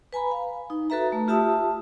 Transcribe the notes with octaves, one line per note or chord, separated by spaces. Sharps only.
B4 G#5 A#5 B5
F5
D#4
F#4 A4 B4 E5 A#5
A3
F4 G4 E5 A5 D#6 E6